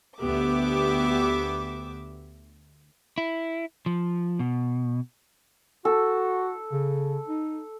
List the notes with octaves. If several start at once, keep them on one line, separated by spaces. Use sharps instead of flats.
D2 B3 G4 E5 D6
E4
F3
B2
F#4 A4
C#3
D#4